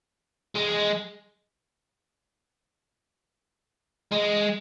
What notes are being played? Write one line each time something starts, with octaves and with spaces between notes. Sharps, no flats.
G#3
G#3